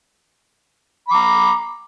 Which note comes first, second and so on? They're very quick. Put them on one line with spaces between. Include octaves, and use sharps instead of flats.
B5 D6 A#5